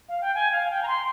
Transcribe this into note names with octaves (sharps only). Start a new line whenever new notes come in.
F5
G5
G#5
F5
G5
A#5
C6